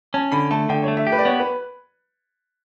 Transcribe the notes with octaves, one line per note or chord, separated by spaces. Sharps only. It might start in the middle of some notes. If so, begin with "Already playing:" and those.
C#4 A5
D3 B5
A3 A5
D3 G5
A3 C#5
E5
G4
B4
D5
B3 C#5
B4